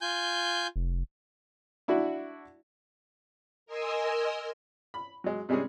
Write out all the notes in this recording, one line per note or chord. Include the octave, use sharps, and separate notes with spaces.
F4 G#5 G6
F1
D4 E4 F#4
A#4 D#5 G#5 C6 E6
B5
F#3 G#3
C3 G3 G#3 C4 C#4 G#4